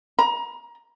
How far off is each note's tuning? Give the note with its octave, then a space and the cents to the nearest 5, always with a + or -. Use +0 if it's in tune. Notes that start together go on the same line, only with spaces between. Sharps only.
A#5 +30